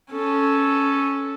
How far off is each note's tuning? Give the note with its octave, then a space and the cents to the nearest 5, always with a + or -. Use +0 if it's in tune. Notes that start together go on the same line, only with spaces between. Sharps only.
C#4 +0 A4 -5